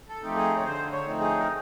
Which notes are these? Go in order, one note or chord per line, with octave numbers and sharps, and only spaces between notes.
A4
F3 A3 C4 D#4 G4
G#4
C#5
D3 C5
C#5
F3 A3 C4 D#4
G#4
A#4